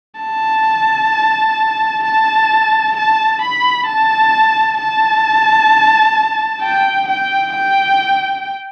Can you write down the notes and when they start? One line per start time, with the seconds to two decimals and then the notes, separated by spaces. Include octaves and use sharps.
0.21 A5
2.05 A5
2.97 A5
3.42 B5
3.87 A5
4.79 A5
6.62 G5
7.08 G5
7.54 G5